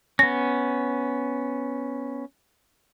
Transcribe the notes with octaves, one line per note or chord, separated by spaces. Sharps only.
B3 C#4 A#6